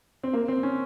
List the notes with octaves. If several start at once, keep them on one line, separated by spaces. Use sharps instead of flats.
C4
A#3
C4
C#4